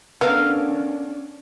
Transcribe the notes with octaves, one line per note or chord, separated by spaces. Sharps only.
B3 C#4 D4 A4 A#4 F5